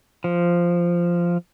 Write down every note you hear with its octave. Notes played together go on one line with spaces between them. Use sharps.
F3